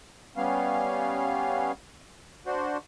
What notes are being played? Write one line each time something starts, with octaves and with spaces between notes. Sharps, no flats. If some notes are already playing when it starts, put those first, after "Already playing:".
G3 B3 C#4 F5
D4 F#4 C5